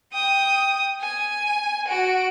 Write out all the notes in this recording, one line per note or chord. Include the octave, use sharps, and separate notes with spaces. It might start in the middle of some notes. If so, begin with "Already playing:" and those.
G5 D#6
G#5
F#4 D7